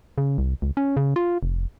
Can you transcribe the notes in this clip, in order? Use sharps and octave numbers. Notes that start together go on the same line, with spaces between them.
C#3
C2
C#2
C#4
C#3
F4
F1